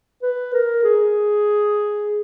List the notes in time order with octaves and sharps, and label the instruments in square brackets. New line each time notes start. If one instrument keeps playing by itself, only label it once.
[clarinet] B4
A#4
G#4